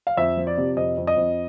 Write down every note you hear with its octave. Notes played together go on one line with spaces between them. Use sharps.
F5
F2 E5
F3
D5
C3
F2 D#5
F2
D#5
F2